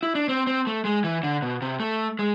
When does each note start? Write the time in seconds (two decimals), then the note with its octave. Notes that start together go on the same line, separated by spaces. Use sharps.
0.03 E4
0.15 D4
0.29 C4
0.47 C4
0.67 A3
0.85 G#3
1.04 E3
1.23 D3
1.42 B2
1.62 C3
1.80 A3
2.19 G#3